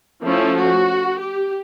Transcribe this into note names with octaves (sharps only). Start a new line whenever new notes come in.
F3 A3 C#4 E4
F#4
G4